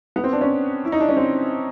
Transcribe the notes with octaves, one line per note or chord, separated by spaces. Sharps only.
B3
C4
D4
C#4
E4
D#4
D4
C#4
C4